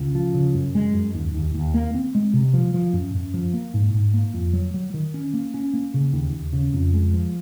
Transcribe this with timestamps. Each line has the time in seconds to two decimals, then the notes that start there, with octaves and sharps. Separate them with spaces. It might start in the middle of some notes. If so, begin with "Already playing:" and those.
Already playing: C#2
0.15 F3
0.34 C#3
0.54 F#2
0.75 G#3
0.94 F#2
1.14 D#2
1.34 D#2
1.54 D#2
1.74 A#3
1.94 C4
2.15 G#3
2.33 C3
2.54 F3
2.74 F3
2.93 F#2
3.14 F#2
3.34 F3
3.53 A#3
3.74 G#2
3.94 G#2
4.14 A#3
4.34 F2
4.53 F#3
4.74 F#3
4.94 D#3
5.14 C#4
5.34 A#3
5.54 C#4
5.73 A#3
5.94 C#3
6.13 D#2
6.33 D#2
6.53 C#3
6.74 F2
6.94 G#3
7.14 F3